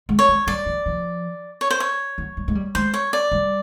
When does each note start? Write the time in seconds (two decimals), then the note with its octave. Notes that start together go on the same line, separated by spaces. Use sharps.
0.09 G#3
0.19 C#5
0.29 G#3
0.47 G3 D5
0.66 F3
0.86 F3
1.61 C#5
1.71 C5
1.80 C#5
2.18 F#3
2.37 G3
2.48 G#3
2.55 G3
2.75 G#3 C5
2.94 C#5
3.13 D5
3.32 G3